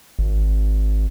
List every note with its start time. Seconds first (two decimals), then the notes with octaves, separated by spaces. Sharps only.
0.19 G#1